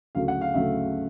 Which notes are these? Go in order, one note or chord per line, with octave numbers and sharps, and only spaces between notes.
D2 C#3 F#3 A3 F5
F#5
F5
D2 C#3 F#3 A3 E5